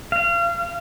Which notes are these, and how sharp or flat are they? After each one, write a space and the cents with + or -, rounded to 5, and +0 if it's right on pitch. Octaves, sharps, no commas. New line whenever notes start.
F5 -30